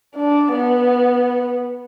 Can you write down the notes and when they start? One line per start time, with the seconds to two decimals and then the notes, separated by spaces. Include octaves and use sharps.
0.16 D4
0.53 B3